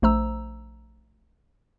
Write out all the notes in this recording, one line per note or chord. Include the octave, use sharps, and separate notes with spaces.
A#1 A3 C5 A#5 E6